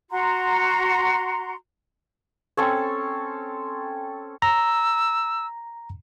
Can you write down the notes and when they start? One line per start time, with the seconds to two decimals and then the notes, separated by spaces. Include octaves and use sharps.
0.10 F#4 A#5 C6
2.57 C4 C#4 A4 C#5
4.42 A#5 E6